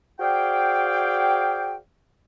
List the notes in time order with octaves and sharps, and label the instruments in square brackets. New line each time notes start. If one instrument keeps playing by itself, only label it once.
[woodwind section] F#4 G#4 C5 D5 F5 G5